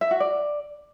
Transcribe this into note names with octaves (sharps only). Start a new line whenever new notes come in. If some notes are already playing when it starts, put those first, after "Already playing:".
E5
F#4
D5